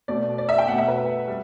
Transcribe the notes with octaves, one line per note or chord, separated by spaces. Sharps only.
B2 A3 D5
D5
E5
G5
B2 A3 F#5
E5
B4
G3